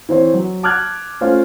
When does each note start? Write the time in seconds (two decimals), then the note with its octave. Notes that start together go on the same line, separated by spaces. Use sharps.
0.09 E3 C4 C5 C#5
0.34 F#3
0.63 A5 D6 F6 F#6 G#6
1.21 A3 C#4 F4 C5 F5